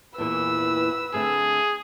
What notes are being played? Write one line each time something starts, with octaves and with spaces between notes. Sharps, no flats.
E2 A#2 E3 B4 E6
D3 A3 C4 G#4